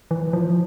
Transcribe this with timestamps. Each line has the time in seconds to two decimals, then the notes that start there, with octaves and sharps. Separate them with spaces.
0.11 E3
0.33 F3